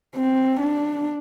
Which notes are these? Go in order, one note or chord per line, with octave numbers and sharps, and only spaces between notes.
C4
D4